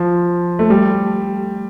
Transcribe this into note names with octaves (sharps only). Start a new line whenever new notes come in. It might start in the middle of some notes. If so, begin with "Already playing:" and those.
Already playing: F3
A3
G3